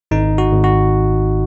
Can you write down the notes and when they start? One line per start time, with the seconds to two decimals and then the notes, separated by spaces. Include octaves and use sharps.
0.11 G#1 D#4
0.38 F#4
0.51 G#1
0.64 F#4